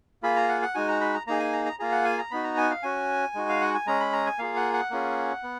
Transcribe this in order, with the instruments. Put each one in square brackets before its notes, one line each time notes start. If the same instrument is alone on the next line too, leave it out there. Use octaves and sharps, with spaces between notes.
[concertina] A#3 F4 G#4 B5
A#5
F#5
F#5
G#3 D#4 F#4 G#5
A#5
B5
A#5
A#3 D#4 G#4 A#5
G#5
A#5
A#5
A#3 F4 G#4 A#5
F#5
G#5
A#5
B3 D#4 F#4 B5
A#5
G#5
F5
C#4 F#4 G#5
G#3 D#4 F#4
F5
F#5
G#5
G#3 C#4 G#4 A#5
B5
A#5
G#5
A#3 F4 G#4 F5
F#5
F#5
A#3 C#4 F4 G#4
B3